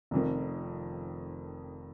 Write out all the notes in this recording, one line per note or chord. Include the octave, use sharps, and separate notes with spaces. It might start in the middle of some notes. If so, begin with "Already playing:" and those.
F1 F2 D#3